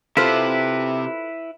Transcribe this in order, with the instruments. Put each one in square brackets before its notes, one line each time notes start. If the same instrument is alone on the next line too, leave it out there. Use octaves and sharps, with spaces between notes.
[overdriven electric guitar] C3 [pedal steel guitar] E4 B4 [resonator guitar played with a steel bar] F4 A4 C5